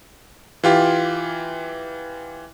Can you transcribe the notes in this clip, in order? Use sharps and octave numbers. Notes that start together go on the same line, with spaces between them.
E3 F4 G4